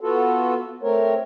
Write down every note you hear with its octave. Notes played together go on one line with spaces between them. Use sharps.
B3 F4 F#4 A4
A3 C4 A#4 C#5